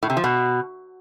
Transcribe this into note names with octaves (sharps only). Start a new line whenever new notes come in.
A2
C3
F3
B2